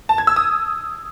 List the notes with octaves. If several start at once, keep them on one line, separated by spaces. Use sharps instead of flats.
A5
G#6
E6
D#6